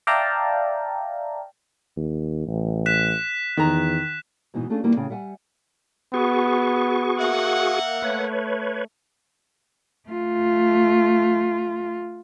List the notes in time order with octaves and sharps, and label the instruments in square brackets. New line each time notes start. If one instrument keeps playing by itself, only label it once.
[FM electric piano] D5 E5 F5 G5 A5 A#5
[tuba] D#2
A1
[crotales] F#6 B6 E7
[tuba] E2 [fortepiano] D#3 A#5
[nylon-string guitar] G#2 B2 E3 D#4
A3 C#4 D4 F4 G#4 A4
D#3 G3 A#3 B3 E4
A2 C#3 G#4 G5
G3 E5 F#5 G#5
[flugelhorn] B3 [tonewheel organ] F#4 G#4 C#6
[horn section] A#3 E5 F#5
[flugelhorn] A3 [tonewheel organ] B4 C#5
[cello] A3 F4